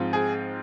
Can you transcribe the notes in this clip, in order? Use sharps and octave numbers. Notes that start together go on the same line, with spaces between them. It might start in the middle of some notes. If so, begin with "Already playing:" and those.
Already playing: G#2 F3 C4 F4
G#4